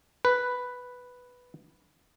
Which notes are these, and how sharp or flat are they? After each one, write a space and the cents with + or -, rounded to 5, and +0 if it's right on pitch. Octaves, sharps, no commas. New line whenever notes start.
B4 +0